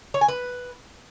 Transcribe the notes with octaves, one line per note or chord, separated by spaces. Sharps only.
C#5
G#5
B4